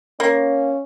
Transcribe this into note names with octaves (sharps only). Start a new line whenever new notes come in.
A#3 C#4